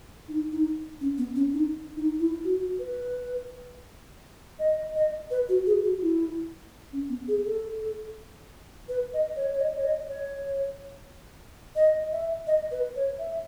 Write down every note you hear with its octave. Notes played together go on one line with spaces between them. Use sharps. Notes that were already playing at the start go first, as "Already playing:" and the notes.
D#4
D#4
C#4
B3
C#4
D#4
D#4
E4
F#4
B4
D#5
D#5
B4
F#4
G#4
F#4
E4
C#4
B3
G#4
A4
B4
D#5
C#5
C#5
D#5
C#5
D#5
C#5
D#5
E5
D#5
B4
C#5
E5